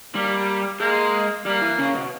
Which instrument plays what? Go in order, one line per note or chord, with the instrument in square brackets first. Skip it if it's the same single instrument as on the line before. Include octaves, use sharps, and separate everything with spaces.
[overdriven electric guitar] G3 [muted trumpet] A#3
[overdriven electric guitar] G#3 [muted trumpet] A#3
[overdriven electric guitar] G3 [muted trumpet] A#3
[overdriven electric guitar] E3
C#3
B2